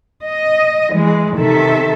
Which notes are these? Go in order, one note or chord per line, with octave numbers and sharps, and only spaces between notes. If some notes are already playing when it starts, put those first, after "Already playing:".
D#5
E3 G#3
C3 D#3 A4 E5